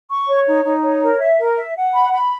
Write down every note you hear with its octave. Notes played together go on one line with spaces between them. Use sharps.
C#6
C#5
D#4
D#4
C#5
A#4
E5
A#4
E5
F#5
B5
B5